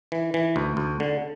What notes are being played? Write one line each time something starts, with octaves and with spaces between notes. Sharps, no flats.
E3
E3
D2
D2
D3